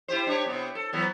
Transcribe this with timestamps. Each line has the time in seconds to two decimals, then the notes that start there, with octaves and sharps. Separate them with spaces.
0.08 E4 G4 C5
0.27 D4 G4 C#5
0.46 C3 B3
0.75 A4
0.93 E3 F#3 B3